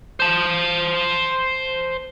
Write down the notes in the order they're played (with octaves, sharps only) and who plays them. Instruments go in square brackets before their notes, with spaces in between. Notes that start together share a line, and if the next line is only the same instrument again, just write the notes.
[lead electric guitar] C5 A5